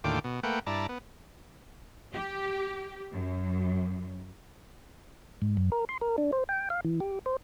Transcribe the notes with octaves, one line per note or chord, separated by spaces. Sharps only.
D#2 A2 D3 F4 G5 D6
B2
A3 A#3 B4 F#5 G5
G2 E4 D5 A5 A#5
B3
G4
F#2
G#2
F#2
A#4
C6
A#4
D4
C5
G5
F5
E3
G4
C5